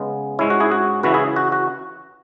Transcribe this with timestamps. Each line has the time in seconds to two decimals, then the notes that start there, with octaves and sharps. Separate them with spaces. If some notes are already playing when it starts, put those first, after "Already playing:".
Already playing: C#3 G#3 B3
0.39 G#2 G#3 C#4 E4
0.50 F#4
0.60 E4 G#4
0.72 F#4
1.03 C#3 E3 C#4 E4 F#4 B4
1.14 E4 G#4
1.36 F#4
1.52 F#4